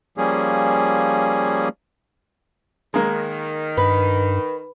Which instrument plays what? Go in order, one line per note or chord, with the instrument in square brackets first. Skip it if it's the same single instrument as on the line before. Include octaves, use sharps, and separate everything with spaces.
[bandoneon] F3 G3 A#3 C#4 G#4
[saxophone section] D#3 [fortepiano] G#3 A#3
[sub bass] G2 [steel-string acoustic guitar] B4